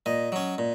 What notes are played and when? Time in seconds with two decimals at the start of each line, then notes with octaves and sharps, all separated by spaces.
0.06 A#2 D#5
0.32 F#3 C#4
0.58 A#2